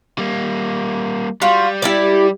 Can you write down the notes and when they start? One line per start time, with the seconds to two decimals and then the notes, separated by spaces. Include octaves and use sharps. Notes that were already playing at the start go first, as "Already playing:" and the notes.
0.18 G3 A#3
1.42 G3 F4 F#4
1.82 E4 G4 D5